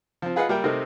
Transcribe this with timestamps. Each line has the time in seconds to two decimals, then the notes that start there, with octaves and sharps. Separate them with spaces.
0.22 F3 C4
0.36 F4 G#4 B4 D#5 F5 F#5
0.49 G3 A#3 A#4 E5 G5
0.64 C3 A3 C4 D#4 A4 A#4